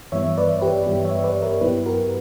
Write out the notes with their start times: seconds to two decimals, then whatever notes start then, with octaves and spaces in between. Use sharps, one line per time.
0.12 G2 E3 G3 B3 C#5 E5
0.38 B4 D5
0.62 G4 B4
0.86 G2 E3 G3 B3 G4
1.05 C#5 E5
1.24 B4 D5
1.42 A#4 C#5
1.61 G2 F#3 B3 E4 G4 B4
1.86 F#4 A#4